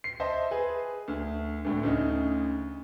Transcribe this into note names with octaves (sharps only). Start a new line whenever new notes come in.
C7
C5 D#5 E5 A5 C6
G#4 B4
D2
D2 A2 D3
D2 C#3 D#4